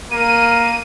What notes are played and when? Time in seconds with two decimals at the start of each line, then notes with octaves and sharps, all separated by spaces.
0.11 A#3 D#7